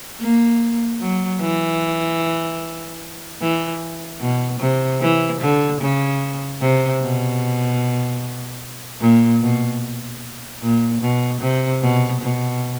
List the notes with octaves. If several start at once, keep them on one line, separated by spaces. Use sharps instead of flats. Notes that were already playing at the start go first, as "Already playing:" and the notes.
A#3
F#3
E3
E3
B2
C3
E3
D3
C#3
C3
B2
A#2
B2
A#2
B2
C3
B2
B2